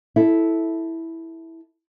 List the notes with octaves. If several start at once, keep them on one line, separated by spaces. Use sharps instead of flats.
E4 A4